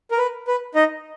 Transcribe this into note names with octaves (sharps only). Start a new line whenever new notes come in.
A#4
B4
B4
D#4 D#5